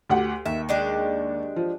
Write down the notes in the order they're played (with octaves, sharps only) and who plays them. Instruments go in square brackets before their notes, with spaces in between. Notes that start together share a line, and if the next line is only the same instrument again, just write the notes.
[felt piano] D2 G4 F#5
[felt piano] D#2 [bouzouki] E5
[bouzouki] G#3 D4 G4
[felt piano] F3